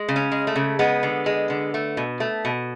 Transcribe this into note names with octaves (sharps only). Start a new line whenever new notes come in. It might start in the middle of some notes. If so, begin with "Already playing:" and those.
Already playing: G#3
C#3
C#4
G#3
A3
C#3
G#3 B3
D3
G#3
D3
A3
B2
A3
B2